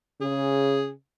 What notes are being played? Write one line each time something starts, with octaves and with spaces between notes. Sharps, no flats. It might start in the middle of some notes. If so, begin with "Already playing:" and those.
C#3 G#4